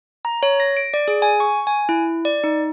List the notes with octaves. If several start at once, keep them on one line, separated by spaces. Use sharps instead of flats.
A#5
C#5
A#6
D7
D5
G#4
G#5
C#6
G#5
E4
D5
D#4